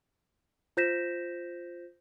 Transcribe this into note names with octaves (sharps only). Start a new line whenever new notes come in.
F4 C5 G6 A#6 B6 E7